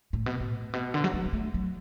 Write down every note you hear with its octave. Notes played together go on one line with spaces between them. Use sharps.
A2
B2
A2
B2
D3
F#3
G#3
G#3
A3
F#3